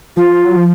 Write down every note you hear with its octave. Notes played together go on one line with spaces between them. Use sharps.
F3 F4
F#3
F3